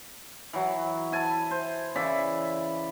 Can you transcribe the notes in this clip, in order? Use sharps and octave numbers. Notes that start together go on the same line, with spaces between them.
E3 F#3
E4 G#5 A5
C5
C#3 E3 D5 E5